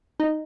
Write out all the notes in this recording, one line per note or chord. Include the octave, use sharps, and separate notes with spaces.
D#4